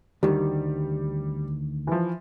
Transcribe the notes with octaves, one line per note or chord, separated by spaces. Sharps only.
D2 D#3 G3
E3 F3